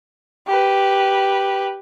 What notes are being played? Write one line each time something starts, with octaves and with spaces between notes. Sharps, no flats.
G4 B4